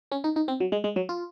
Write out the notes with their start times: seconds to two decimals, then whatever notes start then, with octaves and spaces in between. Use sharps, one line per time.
0.12 C#4
0.24 D#4
0.36 D#4
0.48 C4
0.60 F#3
0.72 G#3
0.84 G#3
0.96 F#3
1.09 F4